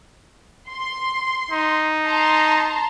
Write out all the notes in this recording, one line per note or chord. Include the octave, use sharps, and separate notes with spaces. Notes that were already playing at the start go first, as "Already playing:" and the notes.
C6
D#4
A5 A#5 C6